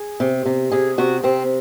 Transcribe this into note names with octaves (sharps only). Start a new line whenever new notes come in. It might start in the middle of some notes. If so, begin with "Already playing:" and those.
Already playing: G#4
C3
C3
C3 G#4
C3 F#4
C3 C4